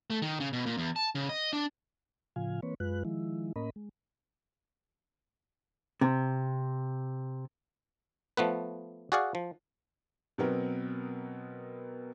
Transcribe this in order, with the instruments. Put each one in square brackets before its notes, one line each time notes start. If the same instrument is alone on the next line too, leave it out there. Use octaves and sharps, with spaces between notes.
[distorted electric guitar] A3
D#3
C#3
B2
A#2
E2
A5
C#3
D#5
D4
[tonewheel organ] A2 C#3 F3 F4 F5 G#5
E3 A#3 C4 B4 C#5
F#2 G#3 F4 B4 F#6
D#3 F3 G#3 E4
A2 A#3 C#4 A#4 D#5 B5
G#3
[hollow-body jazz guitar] C3
[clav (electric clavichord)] F3 A3 B3 B4
F#4 G#4 D5 F5 F#5
F3
[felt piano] B2 F#3 B3 C4 A#4 B4